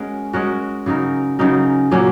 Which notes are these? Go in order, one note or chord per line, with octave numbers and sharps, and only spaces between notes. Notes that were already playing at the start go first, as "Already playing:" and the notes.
Already playing: G#3 C#4 F#4 A#4
G#3 C#4 F#4 A#4
C#3 F#3 D#4 A#4
C#3 F#3 D#4 A#4
A#2 F#3 A#3 C#4